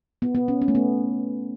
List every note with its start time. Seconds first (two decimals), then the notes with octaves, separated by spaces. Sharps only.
0.22 B3
0.35 B3
0.48 C#4
0.62 C#4
0.68 A3
0.75 B3